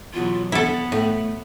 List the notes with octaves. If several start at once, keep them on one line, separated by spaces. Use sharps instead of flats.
E2 B2 F#3 F4
B3 E4 A4 F#5
A2 A3